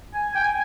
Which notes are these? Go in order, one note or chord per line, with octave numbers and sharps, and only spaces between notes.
G#5
G5
G#5